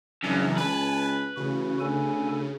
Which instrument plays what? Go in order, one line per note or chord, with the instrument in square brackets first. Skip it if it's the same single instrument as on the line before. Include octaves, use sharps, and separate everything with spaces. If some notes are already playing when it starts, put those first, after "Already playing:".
[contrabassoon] G#1 [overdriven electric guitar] F#2 [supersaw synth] C#3 E3 D4
[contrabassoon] C#2 [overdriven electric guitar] B4 [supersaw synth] G#5 A5
[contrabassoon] A1 [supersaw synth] C#3 [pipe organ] F#4
[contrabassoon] D2 [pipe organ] A4 G#5